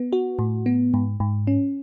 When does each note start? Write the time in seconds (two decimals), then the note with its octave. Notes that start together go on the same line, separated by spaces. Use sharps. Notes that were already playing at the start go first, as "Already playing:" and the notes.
Already playing: B3
0.13 F#4
0.39 A2
0.66 B3
0.94 G#2
1.20 G#2
1.47 C#4